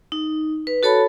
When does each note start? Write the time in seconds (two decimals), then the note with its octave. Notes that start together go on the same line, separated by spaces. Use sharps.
0.12 D#4
0.67 B4
0.83 F#4 A4 C#5 A5 B5